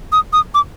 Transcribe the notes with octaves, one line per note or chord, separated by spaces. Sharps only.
D#6
D#6
D6